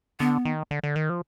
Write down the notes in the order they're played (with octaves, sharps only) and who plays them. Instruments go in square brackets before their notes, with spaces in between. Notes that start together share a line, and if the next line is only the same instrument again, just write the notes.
[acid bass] D3 [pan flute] B3
[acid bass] D#3
D3
D3
D#3
F3